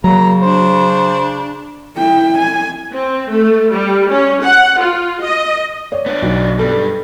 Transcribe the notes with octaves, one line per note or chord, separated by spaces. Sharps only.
C#3 F#3 A#3 A#5
D4 C5
E4 G5
G#5
C4
A3
G3
C#4
F#5
F4
D#5
C#5 D5
B3 D4
B1
G2 G3 A4